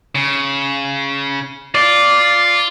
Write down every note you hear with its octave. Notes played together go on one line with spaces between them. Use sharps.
C#3
F4 D5